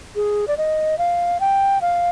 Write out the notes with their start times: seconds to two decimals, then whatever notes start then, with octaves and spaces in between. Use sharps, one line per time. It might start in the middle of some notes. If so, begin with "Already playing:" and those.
0.16 G#4
0.48 D5
0.58 D#5
0.98 F5
1.40 G5
1.81 F5